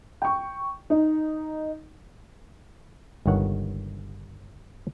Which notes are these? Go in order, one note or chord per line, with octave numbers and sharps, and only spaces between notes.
G5 C#6
D#4
G1 C#2 G2 D#3 C#5 F#5